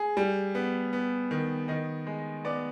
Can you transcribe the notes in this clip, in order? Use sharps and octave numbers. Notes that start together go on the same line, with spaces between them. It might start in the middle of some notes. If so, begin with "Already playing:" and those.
Already playing: G#4
G3
B3
B3
D#3
D#3 D#5
G#3
B3 D5